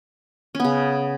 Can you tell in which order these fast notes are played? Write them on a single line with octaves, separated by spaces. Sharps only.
C#4 B3 C#3